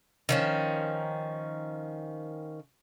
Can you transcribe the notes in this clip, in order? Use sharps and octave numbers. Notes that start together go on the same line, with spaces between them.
D#3 F3 C#4